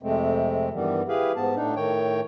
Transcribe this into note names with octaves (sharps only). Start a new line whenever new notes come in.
F2 C3 G#3 A3 C4
G2 D#3 E3 G3 B3
E4 G4 G#4 B4 F5
G#2 B3 A5
A2 D4 D#4
A2 D#3 C#5 G5